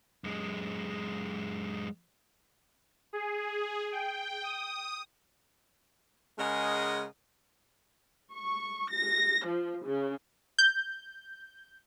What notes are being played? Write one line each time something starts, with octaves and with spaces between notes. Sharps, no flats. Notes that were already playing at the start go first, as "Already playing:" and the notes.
F#2 G#3
G#4
G5
D#6
C#3 G#3 A#4 D#5 F#5
C#6
A#6
F3
C#3
G6